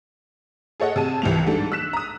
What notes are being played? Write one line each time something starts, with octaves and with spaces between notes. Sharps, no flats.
G#4 A4 C#5 D#5 F#5
C3 G#4 A5 D#7
C2 E3 F3 F7
G#2 G3 D4 A4
E6 F#6 B6 E7
A#5 D#6